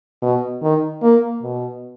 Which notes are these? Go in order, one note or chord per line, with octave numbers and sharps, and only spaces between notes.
B2
D#3
A#3
B2